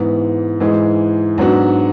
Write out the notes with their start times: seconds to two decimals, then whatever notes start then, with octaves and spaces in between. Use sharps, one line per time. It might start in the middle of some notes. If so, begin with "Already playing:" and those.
Already playing: G#2 E3 B3
0.60 G#2 E3 G#3
1.38 G#2 F#3 B3 D4 F#4